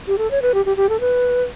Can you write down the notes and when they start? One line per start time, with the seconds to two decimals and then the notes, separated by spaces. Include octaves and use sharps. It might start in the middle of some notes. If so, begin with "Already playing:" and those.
0.08 G4
0.18 A4
0.31 C#5
0.42 B4
0.54 G4
0.66 G4
0.77 G4
0.89 A4
1.00 B4